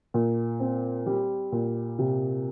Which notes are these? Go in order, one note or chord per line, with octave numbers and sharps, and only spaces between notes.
A#2
C4
G3
A#2
C3